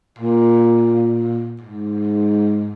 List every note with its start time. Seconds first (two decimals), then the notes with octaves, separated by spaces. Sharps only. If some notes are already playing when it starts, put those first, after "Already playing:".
0.19 A#2
1.61 G#2